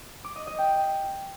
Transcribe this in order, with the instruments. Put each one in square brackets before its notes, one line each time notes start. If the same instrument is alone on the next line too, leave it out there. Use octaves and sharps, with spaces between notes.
[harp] D6
D#5
D#5
G5